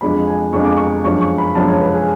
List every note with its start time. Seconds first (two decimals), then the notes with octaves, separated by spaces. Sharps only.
0.01 F2 F3 G#3 D4 B5
0.27 G#5
0.53 F2 F3 G#3 D4 C#6
0.64 D6
0.77 C#6
1.04 F#2 F3 G#3 D4 C#6
1.21 C#6
1.38 B5
1.55 F#2 F3 G#3 D4 A5
1.68 C#5
1.81 B4
1.94 G#4